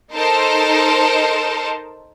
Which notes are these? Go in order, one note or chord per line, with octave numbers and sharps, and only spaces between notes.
D#4 A4 A#4 C5 A5